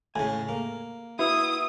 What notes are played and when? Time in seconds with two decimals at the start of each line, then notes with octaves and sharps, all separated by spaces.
0.16 A2 C#3 G#5
0.49 A#3
1.19 E4 F#4 B4 D#6 E6